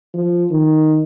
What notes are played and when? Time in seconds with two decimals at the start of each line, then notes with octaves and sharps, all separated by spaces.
0.14 F3
0.51 D#3